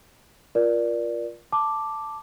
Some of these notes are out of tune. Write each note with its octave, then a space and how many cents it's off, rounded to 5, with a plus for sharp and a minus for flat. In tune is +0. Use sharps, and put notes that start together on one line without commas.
F4 +0 A#4 +30 D5 +0
A5 +5 D6 +0